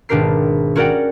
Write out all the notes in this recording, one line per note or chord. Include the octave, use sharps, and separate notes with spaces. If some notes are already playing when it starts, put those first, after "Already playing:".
G#1 B2 D4 G4 A#4 C7
C#4 F#4 A#4 D5 F#5 G5